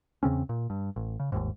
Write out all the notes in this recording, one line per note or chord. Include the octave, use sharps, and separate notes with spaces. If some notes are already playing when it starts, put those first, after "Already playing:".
E2 C#3 C4 C#4
A#2
G2
A1
C#3
G1 D#2 G#2